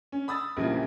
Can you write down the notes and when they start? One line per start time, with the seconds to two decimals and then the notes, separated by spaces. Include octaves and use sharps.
0.12 C#4
0.28 B5 D#6 E6 A6
0.57 A#1 C#3 E3 F3 G3 A#3